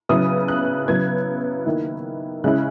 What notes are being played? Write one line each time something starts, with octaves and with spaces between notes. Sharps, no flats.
C#3 F#3 B3 E4 D#6
F#6
C#3 F#3 B3 E4 G#6
D#3 A#3 E4
C#3 G#3 C#4 E4 F#6